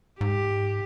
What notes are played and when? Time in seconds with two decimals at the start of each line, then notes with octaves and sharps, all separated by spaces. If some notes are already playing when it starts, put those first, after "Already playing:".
0.21 G#2 G4